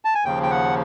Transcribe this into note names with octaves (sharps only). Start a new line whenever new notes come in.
A5
G#5
D#2 C#3 F3 G5
G5
F#5